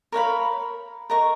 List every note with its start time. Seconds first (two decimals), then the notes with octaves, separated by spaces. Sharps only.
0.12 A#4 C#5 F5 B5
1.10 A#4 D#5 A#5 C#6